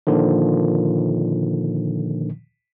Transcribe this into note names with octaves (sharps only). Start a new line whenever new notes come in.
A#2 D3 D#3 F3